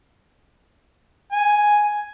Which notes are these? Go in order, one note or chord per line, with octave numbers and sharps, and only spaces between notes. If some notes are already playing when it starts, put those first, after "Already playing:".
G#5